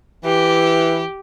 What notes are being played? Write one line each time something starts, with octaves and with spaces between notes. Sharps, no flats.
E3 G4